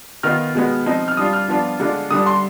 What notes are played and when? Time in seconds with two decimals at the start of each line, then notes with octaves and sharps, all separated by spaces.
0.23 D#3 B3 F4 F6
0.55 B2 G#3 B3
0.86 F3 C4 D#4
1.08 F6
1.17 G3 D4 F4 D#6
1.33 F6
1.48 F3 B3 D4 F4
1.79 D3 G#3 D4 F4
2.10 D3 G3 D4 D#6
2.26 C6